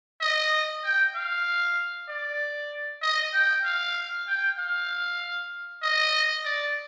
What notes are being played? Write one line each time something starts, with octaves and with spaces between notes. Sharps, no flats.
D#5
G5
F5
D5
D#5
G5
F5
G5
F5
D#5
D5